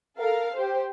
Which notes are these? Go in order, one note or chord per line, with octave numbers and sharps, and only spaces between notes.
A4 A#4 F5
G4 C5